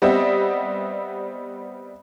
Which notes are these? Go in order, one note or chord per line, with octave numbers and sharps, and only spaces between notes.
G3 B3 C4 G4 D#5 E5